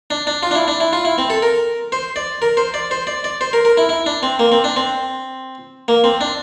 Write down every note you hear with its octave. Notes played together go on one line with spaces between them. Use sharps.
D4
D4
F4
D4
E4
D4
E4
F4
E4
C4
A4
A#4
C5
D5
A#4
C5
D5
C5
D5
D5
C5
A#4
A#4
E4
E4
D4
C4
A#3
C4
D4
C4
A#3
C4
D4